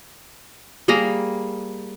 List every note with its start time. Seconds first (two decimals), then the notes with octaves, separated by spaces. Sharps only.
0.88 G3 A#3 G#4 A#5